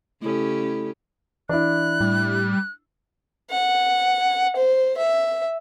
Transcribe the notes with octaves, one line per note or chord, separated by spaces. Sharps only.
C#3 A3 C#4 E4 G4 A4
E3 D4 E4 F#6
A2 G3
F#5
C5
E5